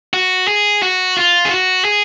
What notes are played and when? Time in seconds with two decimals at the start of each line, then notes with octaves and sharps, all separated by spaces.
0.13 F#4
0.48 G#4
0.83 F#4
1.16 F4
1.45 G#4
1.51 F#4
1.85 G#4